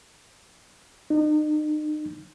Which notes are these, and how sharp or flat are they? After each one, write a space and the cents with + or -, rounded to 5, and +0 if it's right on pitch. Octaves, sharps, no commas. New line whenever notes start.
D#4 -40